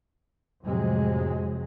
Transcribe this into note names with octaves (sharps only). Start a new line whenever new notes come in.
F2 A2 C3 F#3 G#3